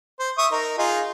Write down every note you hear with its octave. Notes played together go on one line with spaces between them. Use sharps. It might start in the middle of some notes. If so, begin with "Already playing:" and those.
C5
E5 C#6 D#6
D#4 A#4
D#4 F4 G#4